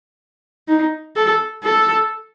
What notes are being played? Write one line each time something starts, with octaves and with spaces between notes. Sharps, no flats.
D#4
A4
A4